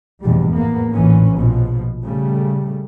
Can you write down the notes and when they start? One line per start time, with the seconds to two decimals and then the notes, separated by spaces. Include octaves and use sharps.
0.22 F1 E2 G#2 B2 G3
0.53 E2 A2 A#3 B3
0.93 A1 D2 A#2 E3 C#4
1.35 A#1 B2 F3
2.02 C#3 G3 A3